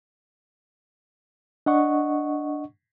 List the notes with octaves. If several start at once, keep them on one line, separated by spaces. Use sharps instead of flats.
D4 D#5 F#5 C#6